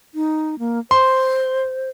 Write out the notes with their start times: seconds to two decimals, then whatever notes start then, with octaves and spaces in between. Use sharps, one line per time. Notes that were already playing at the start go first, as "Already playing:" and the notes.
0.15 D#4
0.59 A#3
0.91 C5 C6